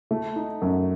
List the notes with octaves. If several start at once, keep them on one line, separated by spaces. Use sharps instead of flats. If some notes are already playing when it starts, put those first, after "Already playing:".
A3
D#4
F#2